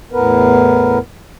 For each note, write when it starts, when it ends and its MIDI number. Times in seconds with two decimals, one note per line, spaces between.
0.12 0.98 40
0.12 0.98 45
0.12 0.98 59
0.12 0.98 70
0.12 0.98 71